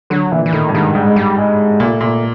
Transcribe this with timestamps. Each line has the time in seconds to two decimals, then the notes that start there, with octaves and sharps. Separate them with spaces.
0.10 D3 F#3
0.32 A#2 E3
0.46 E3
0.53 A2 D#3
0.69 G2
0.74 G#2 D#3
0.95 G#2 G3
1.06 G#3
1.16 G3
1.38 G#3
1.80 A#2 A3
2.01 A#2